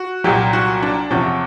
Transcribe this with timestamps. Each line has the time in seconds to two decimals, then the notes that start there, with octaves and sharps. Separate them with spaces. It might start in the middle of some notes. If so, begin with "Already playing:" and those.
Already playing: F#4
0.24 C2 A#2 F#3 G4
0.53 F#4
0.83 D4
1.11 E2 C3 F3 C#4